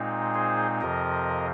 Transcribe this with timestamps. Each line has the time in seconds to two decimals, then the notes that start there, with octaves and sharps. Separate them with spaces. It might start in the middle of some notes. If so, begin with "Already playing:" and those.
Already playing: A#2 G#3 C4 D#4
0.34 G#4 C5
0.81 F2 C3 F3 A#4 D#5